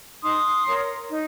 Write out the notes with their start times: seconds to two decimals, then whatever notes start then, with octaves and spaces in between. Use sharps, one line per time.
0.22 D#4 C6 D#6
0.66 A#4 C#5
1.10 D#4